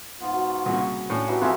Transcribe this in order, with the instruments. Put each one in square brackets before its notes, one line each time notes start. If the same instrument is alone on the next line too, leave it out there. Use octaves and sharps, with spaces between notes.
[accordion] G#2 B3 F4
[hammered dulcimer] F#3
[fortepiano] C2 A#2 C#3 [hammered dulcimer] C#6
[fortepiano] A2 [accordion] C#4 D4
[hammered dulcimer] E3 F#3 G4
[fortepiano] F2 [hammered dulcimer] F4 E5 [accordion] G#4 G#5 F#6